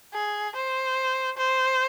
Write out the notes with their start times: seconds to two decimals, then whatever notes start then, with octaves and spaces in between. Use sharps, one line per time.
0.14 G#4
0.55 C5
1.37 C5